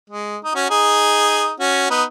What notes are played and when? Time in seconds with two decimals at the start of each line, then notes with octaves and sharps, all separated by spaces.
0.10 G#3
0.45 D#4
0.55 C#4 F#4
0.70 D#4 G#4
1.60 C#4 F#4
1.90 B3 D#4